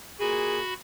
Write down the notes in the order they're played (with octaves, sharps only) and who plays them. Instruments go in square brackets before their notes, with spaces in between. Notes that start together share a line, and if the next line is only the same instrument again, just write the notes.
[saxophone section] A#2 G#4 [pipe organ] F#4 B5